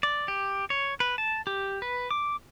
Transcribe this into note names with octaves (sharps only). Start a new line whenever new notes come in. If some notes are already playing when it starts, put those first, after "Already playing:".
D5
G4
C#5
B4
A5
G4
B4
D6